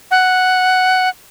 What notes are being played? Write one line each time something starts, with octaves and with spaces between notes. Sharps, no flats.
F#5